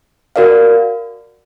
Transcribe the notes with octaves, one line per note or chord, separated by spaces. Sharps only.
F#4 A#4 D5 F5